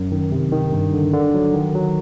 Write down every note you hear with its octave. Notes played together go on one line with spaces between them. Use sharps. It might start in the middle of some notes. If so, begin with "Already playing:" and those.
Already playing: F#2
D#3
C3
D#3
G2
D3
D3
F#3
D#3
F#3